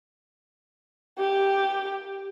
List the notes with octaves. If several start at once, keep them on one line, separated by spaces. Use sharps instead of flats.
G4